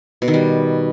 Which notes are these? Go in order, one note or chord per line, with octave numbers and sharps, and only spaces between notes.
B2
D#3
G3